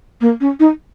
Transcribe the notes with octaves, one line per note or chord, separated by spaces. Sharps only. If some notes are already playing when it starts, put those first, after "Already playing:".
A#3
C#4
D#4